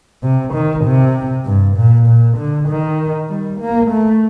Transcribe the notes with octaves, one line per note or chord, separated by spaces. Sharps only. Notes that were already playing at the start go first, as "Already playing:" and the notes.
C3
D#3
C3
G2
A#2
A#2
D3
D#3
G3
A#3
A3